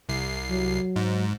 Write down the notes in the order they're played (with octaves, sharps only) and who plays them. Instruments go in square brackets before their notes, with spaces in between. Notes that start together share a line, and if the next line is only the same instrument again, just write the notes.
[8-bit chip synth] C2 C7
[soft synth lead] F#3
[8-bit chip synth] G#2